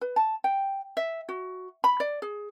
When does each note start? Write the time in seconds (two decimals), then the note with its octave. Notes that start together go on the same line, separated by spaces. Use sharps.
0.01 B4
0.16 A5
0.44 G5
0.97 E5
1.29 F#4
1.84 B5
2.00 D5
2.22 G#4